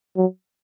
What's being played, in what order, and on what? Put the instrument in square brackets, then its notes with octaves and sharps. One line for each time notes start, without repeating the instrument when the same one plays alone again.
[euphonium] F#3